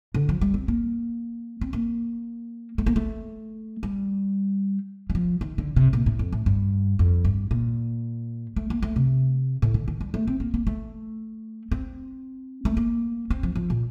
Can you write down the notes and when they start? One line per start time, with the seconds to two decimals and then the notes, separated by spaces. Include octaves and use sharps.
0.14 D3
0.29 F3
0.41 G3
0.54 C4
0.68 A#3
1.61 C4
1.73 A#3
2.78 A3
2.86 A#3
2.96 A3
3.83 G3
5.10 G3
5.15 F3
5.41 D#3
5.58 D3
5.76 C3
5.93 A#2
6.06 A2
6.19 F2
6.32 A2
6.46 G2
6.99 F2
7.25 G2
7.51 A#2
8.56 A3
8.70 A#3
8.83 A3
8.96 C3
9.62 A2
9.74 D3
9.88 D#3
10.01 G3
10.14 A3
10.28 C4
10.40 A#3
10.54 A#3
10.67 A3
11.71 C4
12.65 A3
12.77 A#3
13.30 C4
13.43 F3
13.56 F3
13.70 A#2